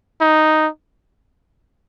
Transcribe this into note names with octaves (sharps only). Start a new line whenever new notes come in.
D#4